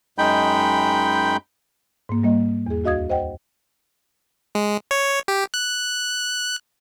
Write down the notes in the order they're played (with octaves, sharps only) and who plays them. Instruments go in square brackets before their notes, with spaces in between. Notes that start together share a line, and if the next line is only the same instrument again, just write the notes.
[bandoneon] F#2 G#3 D#4 G5 B5 G6
[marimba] G#2 A#3
G3 A#3 D#5
E2 G#4
D2 F#4 D#5 F5 D#6 G#6
C5 D#5 F#5 G5
[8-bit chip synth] G#3
C#5
G4
F#6